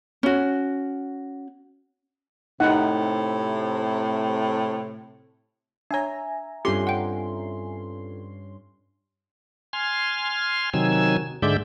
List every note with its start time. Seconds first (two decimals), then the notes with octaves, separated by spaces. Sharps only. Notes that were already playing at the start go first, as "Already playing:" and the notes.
0.23 C#4 F#4
2.60 A2 C3 D#4 F#5
5.91 D4 C#5 E5 G#5 A#5
6.65 G2 C4 C#4 F4 G4 A4 C6
6.87 F#5 G5
9.73 G#5 C6 F6
10.74 C3 D#3 F#3 G#5 E6
11.42 G#2 D3 G#3 D5 E5 G6